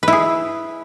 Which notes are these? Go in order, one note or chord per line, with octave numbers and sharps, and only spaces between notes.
E4 G#4 B4